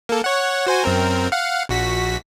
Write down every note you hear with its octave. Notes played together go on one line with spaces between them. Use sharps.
A#3 A4
C#5 F#5
F#4 C5 G#5
F#2 C4 A#4
F5 F#5
A#1 F#4 B6